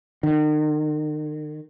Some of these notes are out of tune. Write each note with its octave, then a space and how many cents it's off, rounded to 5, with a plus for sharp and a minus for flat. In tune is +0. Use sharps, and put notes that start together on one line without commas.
D#3 -40